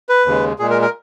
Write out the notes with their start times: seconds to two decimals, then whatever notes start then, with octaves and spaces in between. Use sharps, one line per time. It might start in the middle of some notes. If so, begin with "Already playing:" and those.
0.09 B4
0.26 D#2 C#3 G#3
0.59 A#2 G#3 G#4
0.70 A#4
0.82 A#4